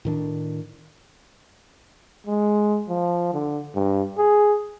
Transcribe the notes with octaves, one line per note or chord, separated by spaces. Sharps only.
A2 D#3 D4
G#3
F3
D3
G2
G#4